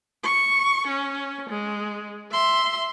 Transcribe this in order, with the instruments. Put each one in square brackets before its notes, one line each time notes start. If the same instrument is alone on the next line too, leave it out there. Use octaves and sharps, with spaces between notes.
[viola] C#6
C#4
G#3
E5 C6